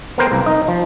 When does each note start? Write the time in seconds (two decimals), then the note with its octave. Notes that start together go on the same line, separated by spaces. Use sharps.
0.18 B3 A#4 C5 G5
0.32 C2 A#3
0.46 D#4 D#5
0.68 F3